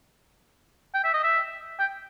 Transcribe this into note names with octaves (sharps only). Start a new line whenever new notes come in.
G5
E5
D#5
E5
G5